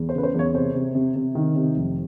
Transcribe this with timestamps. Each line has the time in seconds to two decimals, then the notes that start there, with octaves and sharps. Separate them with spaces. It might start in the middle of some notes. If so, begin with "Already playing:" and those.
Already playing: E2
0.09 C5
0.14 C#3 B4
0.23 C5
0.34 E2 C#5
0.54 C3 C5
0.75 C3
0.95 C3
1.16 C3
1.35 D#3
1.56 C3
1.77 F1